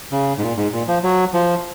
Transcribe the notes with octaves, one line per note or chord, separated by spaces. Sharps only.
C#3
G#2
A#2
G#2
A#2
F3
F#3
F3